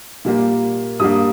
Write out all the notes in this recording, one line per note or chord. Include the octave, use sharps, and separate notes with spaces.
A#2 G3 A#3
G2 G3 A#3 D#6